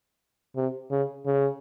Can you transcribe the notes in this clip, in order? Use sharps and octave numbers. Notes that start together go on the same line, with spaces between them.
C3
C#3
C#3